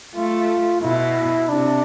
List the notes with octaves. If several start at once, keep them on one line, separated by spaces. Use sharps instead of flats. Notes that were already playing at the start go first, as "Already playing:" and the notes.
A3 F4
B2 E4
C3 D4